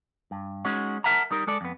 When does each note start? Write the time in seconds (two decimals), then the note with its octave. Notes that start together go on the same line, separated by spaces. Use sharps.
0.31 G2
0.65 G#3 C#4 D#4 F#4
1.04 A#4 E5 F#5 A5 A#5
1.31 G3 D#4 A#4
1.47 G#3 A4 D5
1.61 F2 B3